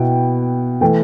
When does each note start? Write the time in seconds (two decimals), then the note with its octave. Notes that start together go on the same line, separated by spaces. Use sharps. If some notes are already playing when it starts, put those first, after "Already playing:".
Already playing: B2 B3 E4 G5
0.81 E3 A3 G5